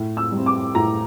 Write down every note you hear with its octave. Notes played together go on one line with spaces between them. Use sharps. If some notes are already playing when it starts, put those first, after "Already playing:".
Already playing: A2
E6
G3 C4
D6
A2 A#5